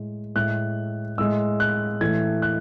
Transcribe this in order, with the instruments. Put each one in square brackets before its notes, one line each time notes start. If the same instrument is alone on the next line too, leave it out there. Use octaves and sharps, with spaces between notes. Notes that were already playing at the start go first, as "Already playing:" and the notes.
Already playing: [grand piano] A2 G#3
A2 G#3 F#6
A2 G#3 E6
F#6
A2 E3 A3 G#6
F#6